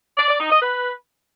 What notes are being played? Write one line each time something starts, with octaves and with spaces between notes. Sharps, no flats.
D5
D5
D#4
D#5
B4